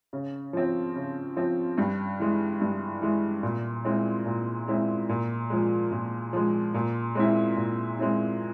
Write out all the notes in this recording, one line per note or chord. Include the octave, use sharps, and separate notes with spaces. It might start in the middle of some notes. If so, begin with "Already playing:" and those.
C#3
F3 C4
C#3
F3 C4
G2
E3 G#3
G2
E3 G#3
A#2
G#3 C4 E4
A#2
G#3 C4 E4
A#2
F3 G#3
A#2
F3 G#3
A#2
G#3 C4 E4
A#2
G#3 C4 E4